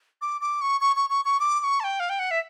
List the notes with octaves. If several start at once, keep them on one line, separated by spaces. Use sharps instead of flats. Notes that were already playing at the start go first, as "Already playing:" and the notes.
D6
D6
C#6
C#6
C#6
C#6
C#6
D6
D6
C#6
A5
G5
F5
G5
F#5
E5